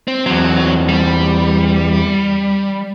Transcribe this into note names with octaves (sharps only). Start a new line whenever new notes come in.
C4
E2 F#3 C4
G3